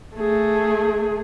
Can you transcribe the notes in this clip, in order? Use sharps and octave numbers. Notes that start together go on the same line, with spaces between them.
A3 G#4